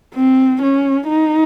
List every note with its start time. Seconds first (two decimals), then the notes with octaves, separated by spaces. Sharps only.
0.15 C4
0.62 C#4
1.08 D#4